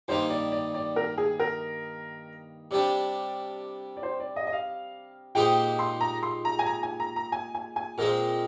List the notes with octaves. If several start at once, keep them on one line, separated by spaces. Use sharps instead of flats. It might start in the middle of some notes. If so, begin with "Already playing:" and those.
G2 D#3 A#3 C5
D5
D5
D5
A#4
G#4
A#4
C3 G3 D4 D5
D5
C5
D5
D#5
D#5
F5
A#2 G#3 D#4 G4 C5 G5
C6
A#5
C6
A#5
G#5
A#5
G#5
A#5
A#5
G#5
G#5
G#5
A#2 G#3 C4 A#4